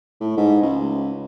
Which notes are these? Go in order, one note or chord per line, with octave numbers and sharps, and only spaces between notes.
A2
G#2
C#2